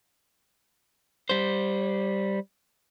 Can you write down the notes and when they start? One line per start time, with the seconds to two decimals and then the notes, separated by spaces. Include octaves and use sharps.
1.29 G3 C5